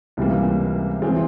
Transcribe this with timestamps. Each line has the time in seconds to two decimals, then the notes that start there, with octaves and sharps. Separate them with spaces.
0.17 C#2 C3 E3 G3 A#3
1.02 E3 G#3 C4